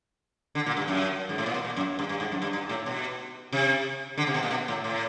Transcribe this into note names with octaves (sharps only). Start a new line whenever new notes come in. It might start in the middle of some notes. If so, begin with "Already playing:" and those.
D3
A#2
G2
F#2
G#2
A2
A#2
B2
A#2
F#2
G2
G2
G#2
F#2
G2
G2
A2
B2
C3
D3
C3
B2
A#2
B2
A2
A2